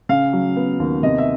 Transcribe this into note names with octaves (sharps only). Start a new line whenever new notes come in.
C#3 F5
F#3
B3
D#2
C3 D#5
E5